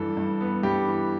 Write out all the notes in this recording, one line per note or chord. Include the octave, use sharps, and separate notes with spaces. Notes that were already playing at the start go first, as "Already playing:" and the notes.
Already playing: G2 E3 A4
G2
B3
G2 G4
E3